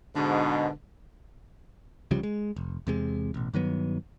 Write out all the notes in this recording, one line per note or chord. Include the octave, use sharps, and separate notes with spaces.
G#2 B2 D3
C2 C#3 F3 G3
G#3
F1
E2 C3 G#3
A1 B2
G2 D#3 F#3 B3